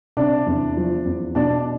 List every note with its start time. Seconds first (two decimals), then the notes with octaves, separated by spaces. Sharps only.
0.17 C3 D4 D5
0.46 E2
0.77 F3
1.05 E2
1.35 B2 D4 D5